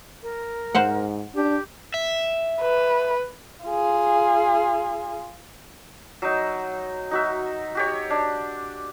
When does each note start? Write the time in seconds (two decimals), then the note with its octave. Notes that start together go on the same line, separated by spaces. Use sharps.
0.23 A#4
0.75 G#2 C5 F5 F#5
1.35 D4 G4
1.94 E5
2.61 B4
3.66 F4 G#4
6.22 F#3 D#4
7.11 D#4 F#4 E5
7.75 F#4 G4 C#5
8.10 D4